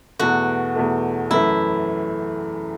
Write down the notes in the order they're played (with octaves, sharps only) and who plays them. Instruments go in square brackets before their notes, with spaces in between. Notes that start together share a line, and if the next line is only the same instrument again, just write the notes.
[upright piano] E2 B2 A3 [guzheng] F#4
[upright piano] E2 B2 A3
[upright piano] F#2 E3 A3 [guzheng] E4